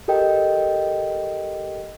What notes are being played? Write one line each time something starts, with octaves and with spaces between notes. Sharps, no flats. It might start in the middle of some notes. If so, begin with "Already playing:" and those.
G4 A4 A#4 D#5 G5